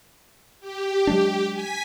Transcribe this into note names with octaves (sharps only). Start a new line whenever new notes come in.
G4
F#3 G#3 D4
G#5 B6